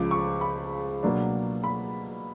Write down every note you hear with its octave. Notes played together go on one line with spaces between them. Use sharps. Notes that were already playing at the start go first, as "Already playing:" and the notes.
Already playing: C#2 C#3 F3 D6
C#6
B5
B2 F#3 A#3 D4
B5